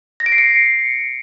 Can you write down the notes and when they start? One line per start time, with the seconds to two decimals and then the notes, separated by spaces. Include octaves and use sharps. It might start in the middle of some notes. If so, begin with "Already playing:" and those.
0.20 A#6
0.26 D7
0.32 C7
0.38 C#7